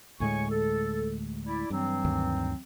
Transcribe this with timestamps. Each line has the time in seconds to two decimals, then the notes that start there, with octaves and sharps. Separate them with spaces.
0.20 D2 A2 G#3 C#5 G#5 C#6
0.50 A4
1.46 E4 D5
1.70 G2 E3 F#3 C4
2.05 D2 G2 D#3